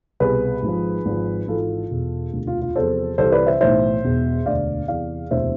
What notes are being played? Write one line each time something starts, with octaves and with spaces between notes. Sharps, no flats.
C2 B2 G#4 B4
G#1 G#2 F3
G#1 G#2 F3
G#1 G#2 E3 F4 A4
E1 E2 B2
E1 D2 C3
F4
F4
E2 C3 F3 A4 C5
C2 C3 E3 A4 C5
B4 D5
C5 E5
B1 A2 E3 C5 E5
E1 E2 B2
E1 D2 D3 D5 F5
E2 C3 E3 D5 F5
E1 D2 C3 E3 C5 E5